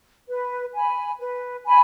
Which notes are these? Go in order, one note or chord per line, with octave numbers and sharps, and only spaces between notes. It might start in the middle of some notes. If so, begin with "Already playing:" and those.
B4
G#5 B5
B4
G#5 B5